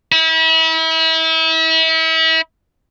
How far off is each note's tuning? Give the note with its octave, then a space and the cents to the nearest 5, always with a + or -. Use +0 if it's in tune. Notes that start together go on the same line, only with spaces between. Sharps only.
E4 -35